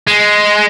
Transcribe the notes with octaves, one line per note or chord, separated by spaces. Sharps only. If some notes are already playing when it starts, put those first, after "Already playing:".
G#3